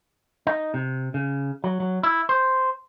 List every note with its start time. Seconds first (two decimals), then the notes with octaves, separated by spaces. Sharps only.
0.47 D#4
0.74 C3
1.14 C#3
1.64 F#3
1.80 F#3
2.03 E4
2.29 C5